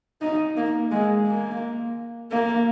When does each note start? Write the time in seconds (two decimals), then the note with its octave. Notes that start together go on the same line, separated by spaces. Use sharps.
0.22 D#4
0.57 A#3
0.91 G#3
1.27 A#3
2.31 A#3